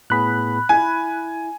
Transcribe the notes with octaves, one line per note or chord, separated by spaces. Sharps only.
A2 B3 G#4 B5 F#6
E4 G#5